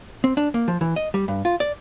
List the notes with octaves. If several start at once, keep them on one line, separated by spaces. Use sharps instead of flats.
C4
D4
A#3
F3
E3
D#5
G3
G2
F4
D5